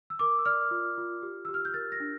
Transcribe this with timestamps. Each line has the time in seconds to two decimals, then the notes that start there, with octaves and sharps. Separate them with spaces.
0.10 E6
0.19 A#4 D6
0.38 E6
0.45 D5 F6
0.71 F4
0.98 F4
1.23 G4
1.45 G4 E6
1.54 F6
1.65 G6
1.74 A#4 A6
1.92 A#6
2.00 D4